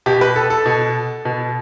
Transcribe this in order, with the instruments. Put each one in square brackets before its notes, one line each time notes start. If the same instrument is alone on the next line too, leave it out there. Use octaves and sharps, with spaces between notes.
[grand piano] B2 G4
B4
A4
A4
B2
B2